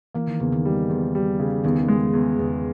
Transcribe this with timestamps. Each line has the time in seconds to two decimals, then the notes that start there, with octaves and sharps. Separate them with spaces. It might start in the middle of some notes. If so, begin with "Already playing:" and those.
0.14 E3 A#3
0.28 D#3
0.40 E2 C#3
0.52 D#3
0.65 G3
0.89 E2
1.15 G3
1.39 C#3
1.64 E2 D#3
1.88 G#3
2.13 E2
2.39 E2